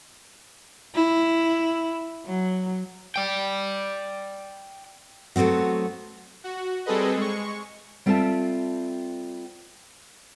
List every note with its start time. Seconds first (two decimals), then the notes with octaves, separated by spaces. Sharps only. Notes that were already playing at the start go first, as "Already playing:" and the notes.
0.95 E4
2.26 F#3
3.16 D5 G5
5.36 F#3 A3 B3 C4 F#4
6.44 F#4
6.86 G3 C4 G#4 A4 B4 D#5
7.17 G#3 C#6
8.06 G3 C4 F4 A4 E5 A5